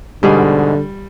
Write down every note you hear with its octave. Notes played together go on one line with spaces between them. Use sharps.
G#2 B2 D3 G3 G#4